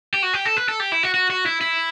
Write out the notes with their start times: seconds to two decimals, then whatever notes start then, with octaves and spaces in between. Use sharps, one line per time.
0.14 G4
0.23 F#4
0.34 G4
0.45 A4
0.57 B4
0.69 A4
0.80 G4
0.92 E4
1.03 F#4
1.14 F#4
1.30 F#4
1.46 E4
1.61 E4